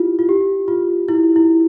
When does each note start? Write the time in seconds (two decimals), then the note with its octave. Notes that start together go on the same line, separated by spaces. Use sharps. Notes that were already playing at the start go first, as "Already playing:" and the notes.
Already playing: E4 F4 G4
0.19 F4
0.29 G4
0.68 F4
1.08 E4
1.36 E4